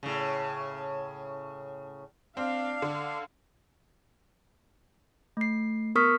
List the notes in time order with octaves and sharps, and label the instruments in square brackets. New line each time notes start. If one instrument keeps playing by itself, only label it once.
[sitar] A2 C#3
[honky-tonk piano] C4 [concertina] D4 [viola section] F5
[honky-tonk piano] D3
[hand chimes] A3 C7
B3 A#4 C#6 D#6 F6 B6